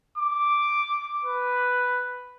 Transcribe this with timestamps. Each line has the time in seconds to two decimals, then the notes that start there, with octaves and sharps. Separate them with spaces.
0.18 D6
1.25 B4